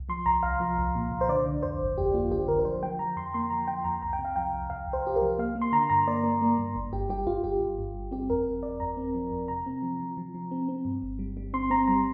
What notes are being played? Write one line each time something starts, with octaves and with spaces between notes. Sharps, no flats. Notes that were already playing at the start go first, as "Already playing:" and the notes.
Already playing: C2
F3 C6
C2 A#5
C2 F5
F3
C2
A#2
C2
C5
D3 D5
D3
F2 C5
G1
F2 G4
A#3 F4
D3 G4
D3 A#4
A#4
F3 C5
F3 G5
F3 A#5
F2 C6
A#3 C6
F3 A#5
F3 G5
F2 A#5
C2 A#5
G5
C3
F5
F3 G5
C2
C2 F5
C2
C5
C2 G4
A#4
F3
A#3 F5
A#3
C6
D3 A#5
G2 A#5
A#3 D5
A#3
A#3
G2
G1
G1 G4
G3 G4
G1 F4
G1 G4
G1
G2
G1
C4 G4
F2 A#4
F2
F2 D5
F2 A#5
C4
F3
F2
C3 A#5
C4
F3
F3
F3
F3
C4
C4
G2
G1
G3
G3
C4 C6
C4 A#5
G3 A#5